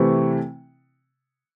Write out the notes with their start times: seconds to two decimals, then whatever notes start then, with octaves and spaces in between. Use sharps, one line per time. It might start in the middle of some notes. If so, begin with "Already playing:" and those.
Already playing: C3 E3 A3 C4 E4 C#6